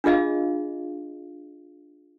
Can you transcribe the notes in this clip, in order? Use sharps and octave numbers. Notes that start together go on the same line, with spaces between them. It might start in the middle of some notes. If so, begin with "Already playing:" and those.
D4 F4 G#4 D#5 F5